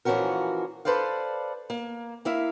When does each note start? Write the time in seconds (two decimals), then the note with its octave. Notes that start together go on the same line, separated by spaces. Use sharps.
0.05 A#2 E3 F3 C#4 F#4 A#4
0.85 A4 B4 C5 D5 F5
1.70 A#3
2.25 A#3 E4 E5 F5